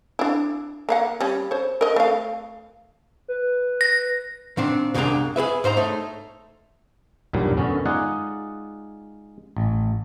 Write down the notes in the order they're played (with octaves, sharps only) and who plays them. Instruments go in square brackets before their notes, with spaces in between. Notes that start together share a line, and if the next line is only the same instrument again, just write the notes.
[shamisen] D4 E4
A#3 F5 F#5
G3 C#4
C5 C#5
A#4 D#5
A3 F5
[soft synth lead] B4
[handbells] A#6
[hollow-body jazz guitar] A#2 D#3 C4 D4
C2 F#2 G#3 A#3 D4 A#5
G#4 A4 B4 E5
G#2 C5 D#5 A#5
A3 D#4 C#5
[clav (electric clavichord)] B1 E2 G2 A#2 F#3 G3
F#2 D3 B3 C#4
G#3 D#4 F4 G#4 D5 F#5
A1